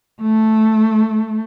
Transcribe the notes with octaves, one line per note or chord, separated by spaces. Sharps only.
A3